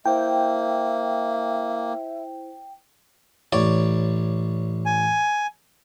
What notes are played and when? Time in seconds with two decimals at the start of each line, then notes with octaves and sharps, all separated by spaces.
0.06 A#3 E4 C5 E5 G5
3.53 A1 C#5 D5
4.86 G#5